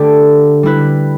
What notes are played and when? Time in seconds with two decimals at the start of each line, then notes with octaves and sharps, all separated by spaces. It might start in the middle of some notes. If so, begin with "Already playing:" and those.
Already playing: D3 A3 G4 D5
0.63 G3 E4 B4